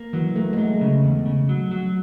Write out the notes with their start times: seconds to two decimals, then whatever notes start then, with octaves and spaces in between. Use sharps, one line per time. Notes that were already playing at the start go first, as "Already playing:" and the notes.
Already playing: A#3
0.13 E3 F#3
0.36 A3 A#3
0.53 G#3
0.58 F#3 A3
0.81 C#3
1.04 E2
1.26 C#3
1.49 F#3
1.71 F#3